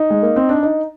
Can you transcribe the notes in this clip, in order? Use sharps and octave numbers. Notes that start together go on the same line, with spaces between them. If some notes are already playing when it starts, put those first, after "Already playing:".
Already playing: D#4
G#3
A#3
C4
D4
D#4